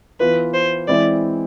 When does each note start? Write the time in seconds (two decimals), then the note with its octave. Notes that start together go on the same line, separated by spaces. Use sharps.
0.20 E3 B3 F4 B4
0.54 C5
0.88 E3 G#3 C4 E4 D5